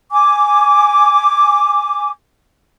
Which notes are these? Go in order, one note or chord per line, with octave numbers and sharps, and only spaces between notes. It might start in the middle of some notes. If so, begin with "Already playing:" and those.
G#5 D6